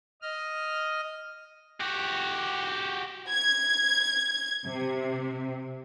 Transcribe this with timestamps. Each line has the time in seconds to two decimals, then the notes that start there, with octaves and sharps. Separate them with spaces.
0.22 D#5 F6
1.80 F#4 G4
3.31 G#6
4.64 C3